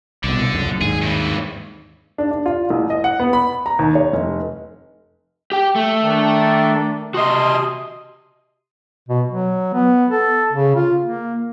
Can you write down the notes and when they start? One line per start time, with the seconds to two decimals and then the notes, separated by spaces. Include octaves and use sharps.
0.24 C2 B2 D3
0.53 C#2 F#2
0.66 F#2 A#2
0.81 D#2 G#2 G#4
1.02 G2 E3
2.18 D4
2.31 D4
2.46 F4
2.70 A1
2.90 D#5
3.04 F#5
3.20 B3
3.33 B5
3.66 A#5
3.79 D#2
3.95 C#5
4.13 F1
5.52 G4 G5
5.76 A3
6.03 D#3 D4
7.14 C3 F#4 G4 D#5 C6 D#6
9.09 B2
9.28 F#3
9.74 B3
10.11 A4
10.53 C#3
10.76 F4
11.04 A#3